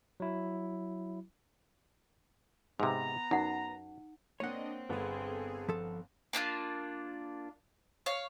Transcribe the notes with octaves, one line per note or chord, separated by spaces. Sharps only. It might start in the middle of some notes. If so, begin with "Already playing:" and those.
F#3 E4
G#2 C3 B3 A#5
F#2 D#4 F#5
A#3 C4 D4 C#5 D#5 F#5
G1 B3 G#4 A4
F3 A4
A#3 D4 E4 F4
C#5 F5